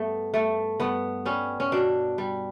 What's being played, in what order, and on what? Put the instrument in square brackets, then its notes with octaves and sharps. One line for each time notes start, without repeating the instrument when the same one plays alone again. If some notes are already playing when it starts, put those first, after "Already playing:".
Already playing: [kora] G2 A3 B3
G2 A3
G2 B3
G3 C#4
C#4
B2 D4
G3